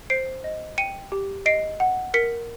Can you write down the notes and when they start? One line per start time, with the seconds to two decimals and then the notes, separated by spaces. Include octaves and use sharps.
0.10 C5 C7 D7
0.44 D#5
0.78 G5 C#7 D#7
1.12 G4
1.46 D#5 C7 D7
1.80 F#5
2.14 A#4 B6 C#7